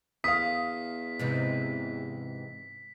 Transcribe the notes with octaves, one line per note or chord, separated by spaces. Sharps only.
E2 F5 D#6 B6
G#2 C3 E3